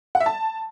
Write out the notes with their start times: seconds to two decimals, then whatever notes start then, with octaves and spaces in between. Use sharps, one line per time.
0.15 F#5
0.20 E5
0.26 A5